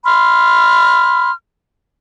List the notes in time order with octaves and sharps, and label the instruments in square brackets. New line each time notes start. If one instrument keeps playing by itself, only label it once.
[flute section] B5 C6 F6